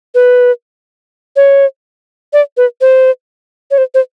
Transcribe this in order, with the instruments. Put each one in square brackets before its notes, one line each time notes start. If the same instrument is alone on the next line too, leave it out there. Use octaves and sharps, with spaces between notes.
[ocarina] B4
C#5
D5
B4
C5
C#5
C5
C5